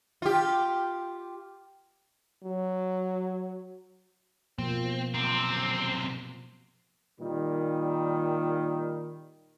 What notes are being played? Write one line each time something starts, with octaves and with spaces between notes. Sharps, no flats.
F4 G4
F#3
B2 F3 A#3 C4
F#2 C3 C4
A#2 D#3 G3